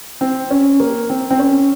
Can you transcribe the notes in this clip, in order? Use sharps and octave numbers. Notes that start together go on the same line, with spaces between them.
C4
C#4
A#3
C4
C4
C#4